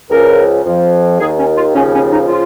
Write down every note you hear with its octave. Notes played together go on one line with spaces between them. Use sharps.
C#2 C#3 F3 A#4
F2 F3
D#2 D#3 G#4
C#4
F4
D#2 C#3 F3 C#4
C#4
D#4
C#3 F3 F4